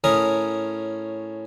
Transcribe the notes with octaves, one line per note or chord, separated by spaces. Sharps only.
A2 C#4 A#4 C#5 D#6